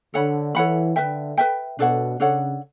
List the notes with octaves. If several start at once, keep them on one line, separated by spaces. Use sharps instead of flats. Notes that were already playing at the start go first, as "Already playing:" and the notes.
D3 A4 C#5 F#5 B5
E3 A4 C#5 F#5 B5
D3 B4 E5 G5
B4 E5 G5
B2 D4 A4 C#5 F#5
C#3 D4 A4 C#5 F#5